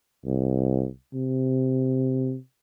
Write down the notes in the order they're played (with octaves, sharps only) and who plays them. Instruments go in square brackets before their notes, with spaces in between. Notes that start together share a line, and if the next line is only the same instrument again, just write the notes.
[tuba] C2
C3